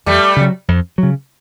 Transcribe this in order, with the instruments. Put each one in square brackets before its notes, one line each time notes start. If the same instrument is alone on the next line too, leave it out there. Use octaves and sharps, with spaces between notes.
[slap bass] F2 [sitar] G3 A3
[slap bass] C#3 F#3
F2
C#3 F#3